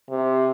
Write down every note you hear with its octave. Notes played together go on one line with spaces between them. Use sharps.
C3